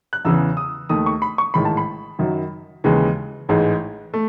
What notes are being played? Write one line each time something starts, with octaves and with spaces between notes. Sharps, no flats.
F#6
E2 C#3 E3 E6
D#6
D#2 D#3 A3 D#6
C#6
B5
C#6
A1 G#2 D#3 G#3 B5
A5
B5
F#2 D#3 F#3
D#2 C#3 E3 G#3
A1 G#2 E3 G#3
A3